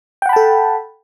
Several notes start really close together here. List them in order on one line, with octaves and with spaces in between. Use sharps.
G5 F#5 B5 A5 A4